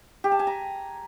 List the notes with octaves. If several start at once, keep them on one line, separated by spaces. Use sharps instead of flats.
G4
A5
G#5
A#5